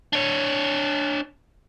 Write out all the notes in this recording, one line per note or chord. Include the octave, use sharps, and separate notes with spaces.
D4 C#5